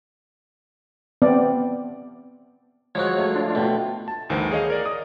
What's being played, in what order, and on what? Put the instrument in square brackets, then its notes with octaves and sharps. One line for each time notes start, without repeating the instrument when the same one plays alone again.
[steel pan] B3 C4 D5
[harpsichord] F3 F#3 F#4 [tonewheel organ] G#3 C#5
[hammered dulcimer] A3 F5
[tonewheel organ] D4 F4
[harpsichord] B2 [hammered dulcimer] A3 G4 C6
[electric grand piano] A5
G1 D2 D#3 E3 C5
G#4 C#5 D#5 F5
A#4 D5
D#6